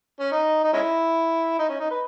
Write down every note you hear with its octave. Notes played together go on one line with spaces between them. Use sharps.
C#4
D#4
D#4
G#3 C#4 E4
D#4
C#4
D#4
B4